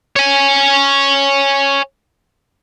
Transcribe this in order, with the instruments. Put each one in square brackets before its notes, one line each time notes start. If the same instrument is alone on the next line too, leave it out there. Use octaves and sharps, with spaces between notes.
[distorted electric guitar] C#5 G#5